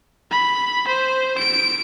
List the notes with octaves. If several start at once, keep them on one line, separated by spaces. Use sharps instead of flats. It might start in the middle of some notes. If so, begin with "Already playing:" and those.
B5
C5
D7